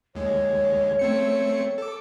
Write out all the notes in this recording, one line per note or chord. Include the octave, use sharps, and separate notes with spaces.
D#2 G#3 C#5
A3 C4 C#7
A4 D6